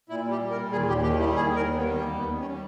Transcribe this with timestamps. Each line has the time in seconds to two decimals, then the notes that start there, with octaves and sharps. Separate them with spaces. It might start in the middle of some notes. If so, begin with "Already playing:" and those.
0.09 A#2 E4
0.25 G3
0.31 G4
0.41 G3
0.51 A#4
0.56 A#2
0.72 D#2 G#4
0.87 D#2 G4
1.03 D#3 G4
1.19 G3 E4
1.35 D#2 G#4
1.51 D#2 A#4
1.67 D#3
1.77 B3
1.82 G3
1.98 D#2 A#3
2.13 D#2
2.19 B3
2.29 D#3
2.40 C#4
2.45 G3